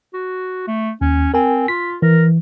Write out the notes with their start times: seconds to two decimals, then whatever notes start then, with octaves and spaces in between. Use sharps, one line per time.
0.14 F#4
0.68 A3
1.01 D#2 C#4
1.34 C4 A#4 G#5
1.68 F4 B6
2.02 E3 A#4